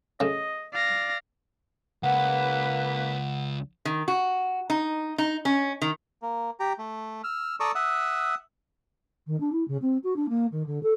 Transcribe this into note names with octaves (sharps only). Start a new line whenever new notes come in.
C#3 A3 D#5
D5 F5 A#6
C#2 A#3 B4 F#5
D#3
F#4
D#4
D#4
C#4
D#3
A#3
G4 A#5
A3
E6 F6
A4 D5 A#5 C#6 D#6 E6
E5 F#5 D#6 E6
D#3
D4
E4
C#3
C4
F#4
D4
A#3
D#3
D3
A4